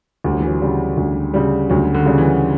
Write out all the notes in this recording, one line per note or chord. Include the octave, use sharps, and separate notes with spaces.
D2 G3
F#3
E3
F#3
C#3 G3
D2
C#3 G3
D2 F#3
D3
C#3 G3
E3